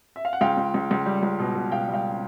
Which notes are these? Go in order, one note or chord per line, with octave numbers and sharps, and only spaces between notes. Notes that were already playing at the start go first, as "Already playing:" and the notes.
E5
F5
F#5
C#2 F5 G5
C#2
C#2
C#2
G3
C#2
B2
B2
B2 F5 G5
G3
F5 G5